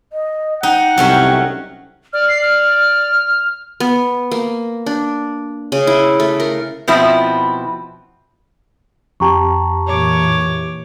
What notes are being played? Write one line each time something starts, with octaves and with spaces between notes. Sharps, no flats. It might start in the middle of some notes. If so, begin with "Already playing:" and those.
D#5
D#4 F#5 G5
C2 F#3 A3 C#4
D5 F6
C7
F6
B3
A#3
D4
C#3
E4
A3
A#4
B2 F3 C4 E4
F2 G4 A5 A#5 C#6
A#2 E3 C#5 D6